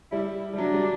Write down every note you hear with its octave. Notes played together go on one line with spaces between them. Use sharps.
G3 E4
G3
F#3 D4
G3